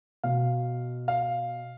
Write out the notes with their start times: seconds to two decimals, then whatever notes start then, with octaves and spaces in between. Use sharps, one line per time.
0.24 B2 F5
1.08 F5